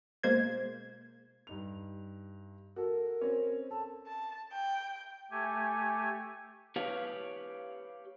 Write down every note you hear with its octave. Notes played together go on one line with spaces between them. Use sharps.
B2 G#3 A#3 C5 G#6
G2 D#4 F7
F#4 A4 A#4
C4 C#4
A4 A5
A5
G5
A3 G4 G#5
G4 B4 C#5 F5